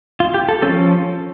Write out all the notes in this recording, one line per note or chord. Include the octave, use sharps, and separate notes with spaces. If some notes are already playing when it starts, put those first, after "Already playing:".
F4
G4
A4
F3 A3 C#4 A4